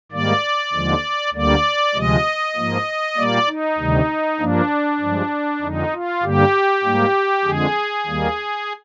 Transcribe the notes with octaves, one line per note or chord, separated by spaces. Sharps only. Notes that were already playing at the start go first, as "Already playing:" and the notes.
G#2 D#3 G3 A#3 D5
D#2 D3 F3 G#3
D2 D3 G3 A#3 D5
D2 C3 F3 G#3 D#5
G#2 F3 A#3
A#2 G3 A#3 D5
D#4
D2 C3 D#3 G3
G2 F3 A#3 D4
G2 F3 G#3
F2 D3 G#3 D#4
F4
G2 D3 G3 A#3 G4
G#2 G3 A#3
F2 D3 G#3 G#4
D#2 D#3 G3 A#3